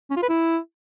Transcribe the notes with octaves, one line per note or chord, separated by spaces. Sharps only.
C#4
F4
B4
E4